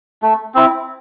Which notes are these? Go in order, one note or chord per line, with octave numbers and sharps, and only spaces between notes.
A3
C4 E4